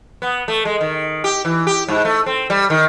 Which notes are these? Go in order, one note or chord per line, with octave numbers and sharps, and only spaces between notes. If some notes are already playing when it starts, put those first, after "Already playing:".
B3
A3
G#3
D#3
G4
E3
G4
G#2
A3
C4
G3
D#3